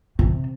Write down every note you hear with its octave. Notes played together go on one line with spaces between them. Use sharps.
C3